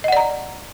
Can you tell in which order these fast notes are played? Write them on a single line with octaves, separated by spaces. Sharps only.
D#5 F#5 D5 A#5